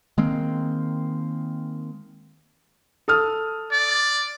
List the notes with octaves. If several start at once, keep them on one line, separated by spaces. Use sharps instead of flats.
D#3 G#3 A#3 C4
A4 D#6 F6
D5